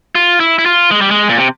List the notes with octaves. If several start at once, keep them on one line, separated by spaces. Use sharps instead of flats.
F4
E4
E4
F4
G#3
G3
G#3
A#2
C3